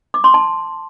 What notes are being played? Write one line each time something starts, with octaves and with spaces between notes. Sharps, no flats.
D6
C6
A5